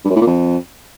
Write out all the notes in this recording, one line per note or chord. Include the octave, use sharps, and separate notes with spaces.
G2
F#2
A2
A#2
F2